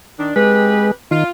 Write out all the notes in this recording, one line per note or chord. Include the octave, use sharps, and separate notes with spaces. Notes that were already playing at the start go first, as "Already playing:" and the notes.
D#3 D4
G#3 C4 G4 B4
D#3 F4